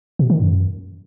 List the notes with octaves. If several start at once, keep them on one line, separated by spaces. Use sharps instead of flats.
B2
D#3
F#2